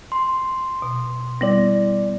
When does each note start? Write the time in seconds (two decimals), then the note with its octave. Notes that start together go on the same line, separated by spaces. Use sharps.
0.12 C6
0.82 B2
1.41 G3 B3 E4 D5